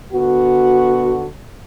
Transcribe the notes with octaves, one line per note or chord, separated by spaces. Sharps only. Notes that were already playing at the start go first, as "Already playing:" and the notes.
D3 B3 F#4